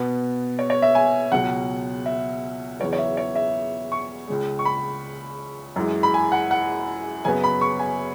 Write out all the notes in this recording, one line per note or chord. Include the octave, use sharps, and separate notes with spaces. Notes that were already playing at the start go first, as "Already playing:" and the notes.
Already playing: B2 B3
C#5
C#5
E5
G#5
C#2 B2 F#3 F#5
E5
E2 C#3 F#3 B3 C#5
C#5
E5
C#5
E5
C#6
C#2 C#3 G#3
C#6
B5
F#2 E3 G#3
B5
G#5
F#5
F#5
F#2 C#3 F#3 B3 G#5
B5
C#6
G#5